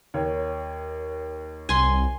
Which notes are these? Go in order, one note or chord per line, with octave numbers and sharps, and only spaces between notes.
D#2 C#5
C2 G#5 C6